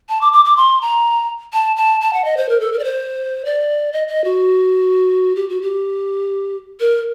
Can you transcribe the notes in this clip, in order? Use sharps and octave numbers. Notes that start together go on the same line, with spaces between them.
A5
D6
D6
D6
C6
A#5
A5
A5
A5
F#5
D#5
C5
A#4
A4
A#4
D5
C5
D5
D#5
D#5
F#4
G4
F#4
G4
A#4